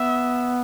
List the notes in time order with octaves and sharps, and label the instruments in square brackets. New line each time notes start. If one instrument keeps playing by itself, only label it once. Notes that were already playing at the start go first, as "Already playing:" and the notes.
Already playing: [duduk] B3 [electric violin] E5